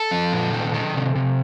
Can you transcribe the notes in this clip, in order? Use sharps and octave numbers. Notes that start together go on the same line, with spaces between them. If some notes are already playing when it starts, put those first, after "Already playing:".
Already playing: A4
F3
A#2
D#3
D#3
C3
C3